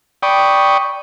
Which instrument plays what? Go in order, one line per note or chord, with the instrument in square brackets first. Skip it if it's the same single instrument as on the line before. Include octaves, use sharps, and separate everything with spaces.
[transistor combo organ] D5 G5 B5 C#6 D#6